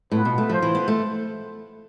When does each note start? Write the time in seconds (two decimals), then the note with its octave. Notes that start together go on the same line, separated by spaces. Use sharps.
0.12 A2 B3 F4 B4
0.25 B2
0.38 A3
0.49 F3 F4 A4 C5
0.62 E3
0.75 B3
0.88 A3